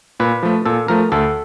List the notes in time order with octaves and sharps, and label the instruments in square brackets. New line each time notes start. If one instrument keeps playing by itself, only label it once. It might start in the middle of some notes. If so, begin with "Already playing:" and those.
[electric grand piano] A#2 [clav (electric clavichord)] B4
[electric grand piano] F3 A3
[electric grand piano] A#2 [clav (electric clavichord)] A4
[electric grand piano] F3 A3 [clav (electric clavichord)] A#4
[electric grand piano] D2 [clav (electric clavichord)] A4